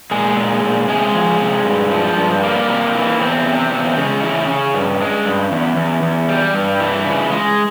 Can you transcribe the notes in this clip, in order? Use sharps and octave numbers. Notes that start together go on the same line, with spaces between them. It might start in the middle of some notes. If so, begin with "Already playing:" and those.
A#2 G#3 G#4
A#2
A#2
C3 G#3 G#4
F3
C3
G2
F3
G2
G3 A#3
C3
E3
E2 C4
C3
E2
C#3 G#3 C#4
E3
C#3
G2
G#3
G2
E2
E2
E2
G3
G2
E3
C#3
G#3